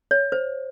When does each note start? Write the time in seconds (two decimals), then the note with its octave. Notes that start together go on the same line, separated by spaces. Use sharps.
0.11 C#5
0.32 C5